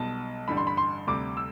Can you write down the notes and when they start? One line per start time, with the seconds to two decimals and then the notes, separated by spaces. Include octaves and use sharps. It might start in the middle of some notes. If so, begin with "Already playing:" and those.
Already playing: B1 B2 G3 A5
0.48 A1 G2 D3 G3 B5
0.57 C6
0.67 B5
0.77 C6
1.07 D2 C3 G3 D6
1.37 E6